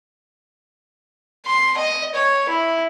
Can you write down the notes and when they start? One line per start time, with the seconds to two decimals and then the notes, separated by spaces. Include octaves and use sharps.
1.46 C6
1.78 D#5
2.15 C#5
2.49 E4